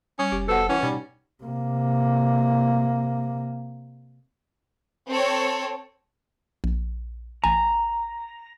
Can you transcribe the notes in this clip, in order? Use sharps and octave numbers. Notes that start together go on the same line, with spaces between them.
G3 C#4 C#6
F1 G4
B2 A4 B4 C5 F#5
E3 C#4 F#5
B2 G3 D#4
C3 A#3
C4 A4 C#5
A#1
A1 G#5 A#5